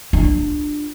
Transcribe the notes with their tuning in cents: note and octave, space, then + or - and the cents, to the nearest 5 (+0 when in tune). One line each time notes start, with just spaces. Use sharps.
D4 +15 F4 +0